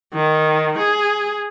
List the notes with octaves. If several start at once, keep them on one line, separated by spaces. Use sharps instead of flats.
D#3
G#4